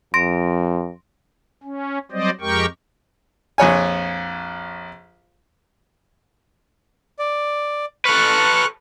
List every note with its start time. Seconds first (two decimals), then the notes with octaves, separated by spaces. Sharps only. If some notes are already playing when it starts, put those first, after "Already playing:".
0.14 F2 C6 A#6 D7
1.63 C#4
2.11 F#3 G3 C4 C5 D5 D#5
2.41 F2 G#3 G4 A#4 G5 C#6
3.58 A#1 F2 C#5 G#5
7.19 D5
8.05 A4 B4 C#6 F6 F#6